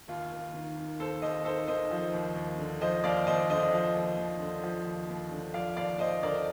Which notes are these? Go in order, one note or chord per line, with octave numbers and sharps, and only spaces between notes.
D#2 F4
D#2
D#3
D#3
D#2 A4 C5
D#2 C5 D#5
D#3 A4 C5
D#3 C5 D#5
F3
D#2
D#2
D3
F3 C5 D#5
D#2 D5 F5
D#2 C5 D#5
D3 C5 D#5
F3
D#2
D#2
D3
F3
D#2
D#2
D3
F3 D5 F5
D#2 D5 F5
D#2 C5 D#5
D3 A#4 D5